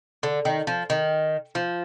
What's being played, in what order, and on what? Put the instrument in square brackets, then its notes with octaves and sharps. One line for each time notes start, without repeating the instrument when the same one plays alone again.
[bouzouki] D3
D#3
F3
D#3
F3